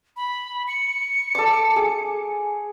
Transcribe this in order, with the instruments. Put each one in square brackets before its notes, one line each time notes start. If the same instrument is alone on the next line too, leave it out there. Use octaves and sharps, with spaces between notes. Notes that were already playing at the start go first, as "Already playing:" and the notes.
[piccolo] B5
C#7
[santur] A4 D6
G#4